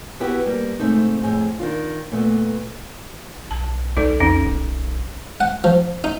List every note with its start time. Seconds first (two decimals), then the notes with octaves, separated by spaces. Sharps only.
0.20 B3 E4 F#4 G4 B4 F#5
0.46 G3 A#3
0.79 G#2 C3 A3 C4 D#4
1.23 F2 A2 C4 G#4
1.59 D#3 D4 F4
2.12 A#2 A3 B3
3.51 B1 A5
3.97 D2 D#4 A4 D5
4.20 F2 C#4 D#4
4.45 D1
5.41 F#5
5.64 F3
6.04 D#4